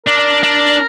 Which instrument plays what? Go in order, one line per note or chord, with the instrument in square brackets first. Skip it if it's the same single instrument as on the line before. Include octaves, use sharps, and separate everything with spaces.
[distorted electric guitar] D4 [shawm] A#4
[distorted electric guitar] D4